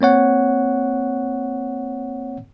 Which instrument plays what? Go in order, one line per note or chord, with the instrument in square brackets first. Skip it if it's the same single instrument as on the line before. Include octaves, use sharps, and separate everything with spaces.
[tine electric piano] A#3 C4 C#5 F#5